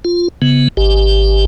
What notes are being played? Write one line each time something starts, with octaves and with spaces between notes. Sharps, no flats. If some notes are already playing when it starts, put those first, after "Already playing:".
F4
C#3 B3
G#1 G4